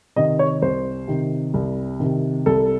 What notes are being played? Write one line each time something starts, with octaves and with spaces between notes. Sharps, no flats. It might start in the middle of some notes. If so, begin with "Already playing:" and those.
C3 D#3 D#5
C#5
C2 C5
C3 D#3
C2
C3 D#3
C2 A4